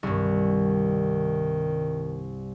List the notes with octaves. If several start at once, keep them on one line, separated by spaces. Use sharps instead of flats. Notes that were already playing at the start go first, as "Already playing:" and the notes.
C2 G2 D#3